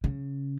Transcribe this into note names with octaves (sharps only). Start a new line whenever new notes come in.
C#3